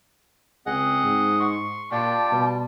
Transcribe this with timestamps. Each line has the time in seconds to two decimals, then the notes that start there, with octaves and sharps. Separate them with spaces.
0.66 C#2 C4 G#4 D#5 F#5
1.04 G#2
1.40 C6 C#6
1.92 A#2 F4 G4 D5 G5 A5
2.32 B2 G3